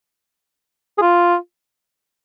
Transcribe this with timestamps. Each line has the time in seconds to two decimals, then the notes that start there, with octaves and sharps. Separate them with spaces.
0.98 G#4
1.02 F4